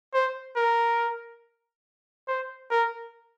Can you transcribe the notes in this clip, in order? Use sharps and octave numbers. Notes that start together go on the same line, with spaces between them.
C5
A#4
C5
A#4